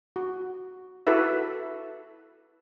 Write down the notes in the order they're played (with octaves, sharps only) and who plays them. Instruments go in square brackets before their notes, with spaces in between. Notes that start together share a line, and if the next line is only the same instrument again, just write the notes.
[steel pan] F#4
E4 F#4 A4 B4 E5